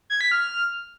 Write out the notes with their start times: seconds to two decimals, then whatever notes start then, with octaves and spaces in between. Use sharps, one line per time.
0.10 G#6
0.21 B6
0.31 F6